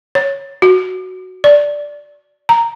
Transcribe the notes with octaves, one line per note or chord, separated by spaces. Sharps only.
C#5
F#4
D5
A#5